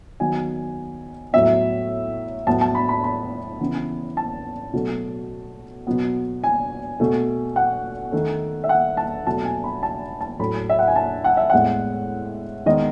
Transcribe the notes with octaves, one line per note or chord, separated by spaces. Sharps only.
D#3 F#3 B3 G#5
A2 F#3 B3 E5
A2 F#3 B3 A5
A5
B5
B5
B5
C#3 E3 B3
A5
B2 F#3 A3
B2 F#3 B3
G#5
B2 A3
F#5
D#3 A3
E5
F#5
A5
B2 F#3 A3 A5
G#5
B5
A5
A5
A2 F#3 A3 B5
E5
F#5
G#5
A5
F#5
E5
A2 G#3 B3 F#5
D#3 G#3 B3 D#5